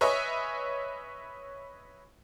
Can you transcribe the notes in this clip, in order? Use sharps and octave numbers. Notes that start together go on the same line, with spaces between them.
B4 C#5 D#5 E5 G#5 C#6